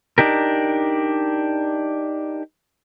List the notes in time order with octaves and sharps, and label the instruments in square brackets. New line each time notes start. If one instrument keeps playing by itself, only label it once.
[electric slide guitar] D4 D#4 G4 A#4